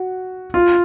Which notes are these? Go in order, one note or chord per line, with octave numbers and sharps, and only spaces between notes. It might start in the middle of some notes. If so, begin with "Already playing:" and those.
Already playing: F#4
F4